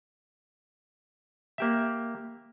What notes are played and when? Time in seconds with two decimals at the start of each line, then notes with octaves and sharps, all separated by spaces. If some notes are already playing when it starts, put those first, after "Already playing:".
1.58 A#3 G4 E5